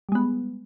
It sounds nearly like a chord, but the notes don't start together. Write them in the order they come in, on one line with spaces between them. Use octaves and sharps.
G3 G#3 B3